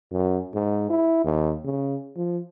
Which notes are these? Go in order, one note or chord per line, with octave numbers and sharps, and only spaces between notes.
F#2
G#2
E4
D#2
C#3
F3